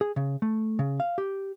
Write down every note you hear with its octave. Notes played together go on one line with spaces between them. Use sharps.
G#4
C#3
A3
C#3
F5
G4